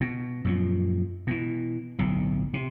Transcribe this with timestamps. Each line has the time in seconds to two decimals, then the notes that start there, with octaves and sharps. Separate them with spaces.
0.01 B2
0.45 F#2 A#2 F3
1.27 B2 E3
1.99 D1 B1 A2
2.54 C3